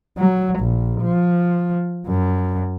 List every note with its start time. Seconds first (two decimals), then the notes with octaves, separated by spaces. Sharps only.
0.18 F#3
0.59 A#1
1.02 F3
2.07 F#2